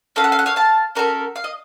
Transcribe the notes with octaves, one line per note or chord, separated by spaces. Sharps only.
C#4 F#4 A4 F5
F#5
F5
F#5
C#5 F5
F5 A5
C#4 F#4 A4 A#4 C#5
F5
D#5